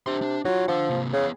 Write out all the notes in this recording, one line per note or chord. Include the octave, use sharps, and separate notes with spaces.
C3 D4 C6
D4
F#3 D#4 F4
F3 D4 F#5
C3 A#3
C#3 B3 G#4